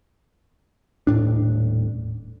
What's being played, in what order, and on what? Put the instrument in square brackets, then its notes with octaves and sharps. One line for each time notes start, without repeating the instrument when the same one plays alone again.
[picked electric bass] D#1 A2 D4